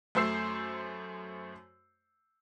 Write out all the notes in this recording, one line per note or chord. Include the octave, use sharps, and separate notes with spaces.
F#2 A3 C5 E6 C7